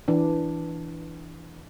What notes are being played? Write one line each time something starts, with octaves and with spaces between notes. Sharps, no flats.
E3 D4